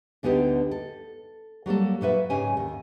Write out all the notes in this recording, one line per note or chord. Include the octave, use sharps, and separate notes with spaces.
D2 D3 B3 D#4 G4
A4
F#3 G3 A#3 A4
A#2 F#3 B4 E5
G#2 C#3 C#4 G4 G#5
D#2